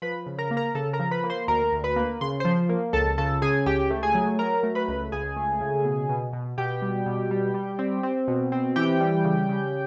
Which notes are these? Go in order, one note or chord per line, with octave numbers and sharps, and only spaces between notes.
F3 B4 B5
C#3
A#4 A#5
A#3
A#4 A#5
C#3 A4 A5
A#4 A#5
F3
B4 B5
A#3
C5 C6
D2 A#4 A#5
D2
B4 B5
A#3
C#3 C6
F3 C5 C6
A#3
C#2 A4 A5
C#3 A4 A5
C#3 G#4 G#5
C#2 G4 G5
A3
G#4 G#5
F#3
F#3 A#4 A#5
A3
B4 B5
C#2
C#2 G#4 G#5
A3
C#3
B2
B2
B2
B2 G4 G5
G3
B2
G3
G3
C4
C4
B2
C4
E3 G4 G5
G3
C#3
C#3